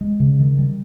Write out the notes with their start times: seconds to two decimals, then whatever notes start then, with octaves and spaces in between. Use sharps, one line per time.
0.01 G#3
0.20 C#3
0.40 D#3
0.58 G3